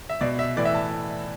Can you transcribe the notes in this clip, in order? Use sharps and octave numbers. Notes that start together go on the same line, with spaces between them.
E5
B2 D5
E5
A2 E3 D5
E5
A5